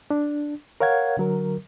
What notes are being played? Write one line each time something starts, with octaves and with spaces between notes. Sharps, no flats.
D4
A#4 C#5 F5 F#5 G#6
D3 F#3 A#4